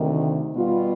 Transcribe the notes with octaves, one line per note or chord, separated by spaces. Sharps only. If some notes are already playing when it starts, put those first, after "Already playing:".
Already playing: D2 C3 D#3
B2 G3 B3 F4